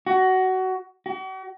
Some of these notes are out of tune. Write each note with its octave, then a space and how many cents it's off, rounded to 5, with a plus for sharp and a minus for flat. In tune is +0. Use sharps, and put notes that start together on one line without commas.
F#4 +20
F#4 +45